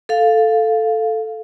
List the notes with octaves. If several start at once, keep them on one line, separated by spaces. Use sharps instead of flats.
A4 F5